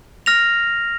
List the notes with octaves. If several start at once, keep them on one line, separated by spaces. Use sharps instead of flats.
F6 A#6 F7